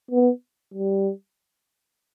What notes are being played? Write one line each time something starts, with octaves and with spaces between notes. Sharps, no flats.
B3
G3